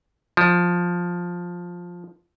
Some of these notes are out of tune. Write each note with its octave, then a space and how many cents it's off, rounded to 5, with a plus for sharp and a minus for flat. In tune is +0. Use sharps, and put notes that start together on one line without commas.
F3 +10